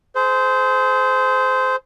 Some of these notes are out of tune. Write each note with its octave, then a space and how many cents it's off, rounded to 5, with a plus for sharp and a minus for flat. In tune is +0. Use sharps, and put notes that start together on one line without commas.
G#4 +40 C5 -15